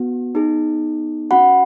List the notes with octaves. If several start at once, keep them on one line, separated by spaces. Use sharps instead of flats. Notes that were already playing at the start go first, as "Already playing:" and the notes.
Already playing: B3 F#4
B3 D#4 G#4
C#4 F#4 F#5 B5